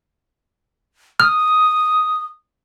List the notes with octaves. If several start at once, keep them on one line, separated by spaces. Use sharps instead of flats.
D#6 F6